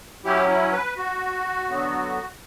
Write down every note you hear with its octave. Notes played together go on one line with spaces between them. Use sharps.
F#3 C#4 E4 G4
E4
B4
F#4
D3 F#3 B3